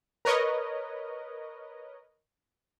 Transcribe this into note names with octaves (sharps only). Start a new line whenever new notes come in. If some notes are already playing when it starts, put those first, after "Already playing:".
A#4 B4 C#5 D#5